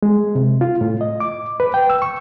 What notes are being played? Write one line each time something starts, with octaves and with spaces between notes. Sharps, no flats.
G#3
C3
F4
A2
D#5
D6
B4
G5
E6
C#6